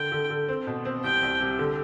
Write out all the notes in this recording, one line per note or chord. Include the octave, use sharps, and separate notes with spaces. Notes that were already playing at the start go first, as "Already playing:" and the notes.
Already playing: D3 G5
D3
D3
C4
B2
C4
C2 G5
C2
C3
D3